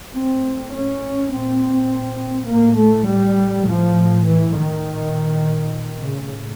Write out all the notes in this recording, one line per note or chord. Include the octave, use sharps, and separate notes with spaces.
A2 C4
C#4
A#2 C4
A2 A#3
A3
G3
A2 F3
E3
D#3
A#2
A2 C#3